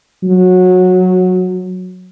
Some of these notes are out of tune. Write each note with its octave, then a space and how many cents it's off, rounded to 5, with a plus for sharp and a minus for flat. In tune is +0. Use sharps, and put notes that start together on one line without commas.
F#3 -15